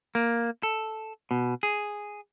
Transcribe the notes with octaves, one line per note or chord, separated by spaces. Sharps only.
A#3
A4
B2
G#4